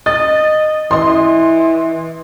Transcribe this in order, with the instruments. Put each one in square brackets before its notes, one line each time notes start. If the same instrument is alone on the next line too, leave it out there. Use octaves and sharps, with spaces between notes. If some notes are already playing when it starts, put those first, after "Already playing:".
[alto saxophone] D#5 [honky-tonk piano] A6
[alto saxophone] E3 [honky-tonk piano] D#5 C6